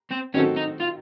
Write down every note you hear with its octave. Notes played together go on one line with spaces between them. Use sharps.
C4
D#3 F#3 C4 C#4 F#4 A4
D#4
F4